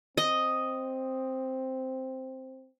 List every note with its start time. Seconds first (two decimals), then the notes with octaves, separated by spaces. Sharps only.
0.18 C4 D#5